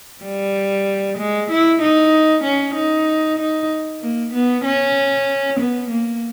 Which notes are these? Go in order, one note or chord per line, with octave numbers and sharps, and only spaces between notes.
G3
G#3
E4
D#4
C#4
D#4
D#4
A#3
B3
C#4
B3
A#3